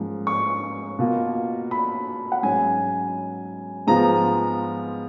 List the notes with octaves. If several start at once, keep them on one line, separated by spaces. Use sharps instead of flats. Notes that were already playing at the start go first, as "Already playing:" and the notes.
Already playing: G#2 F3 A#3 C#4 F4
C#6
B2 A#3 F4
B5
F#5
G#2 F#3 C#4 G#5
G#2 F3 G#3 B3 F4 A#5